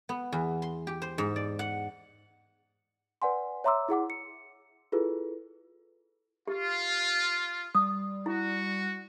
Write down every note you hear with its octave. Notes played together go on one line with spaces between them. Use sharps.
B3
E2
C6
G4
C5
G#2
D5
F#5
B4 D5 F#5 G#5 C6
C#5 E5 A#5 C6 D6 E6
E4 G#4 F#5 D6
C#7
E4 F4 G#4 A4 B4
F4 G4
G3 D#6
E4 F#4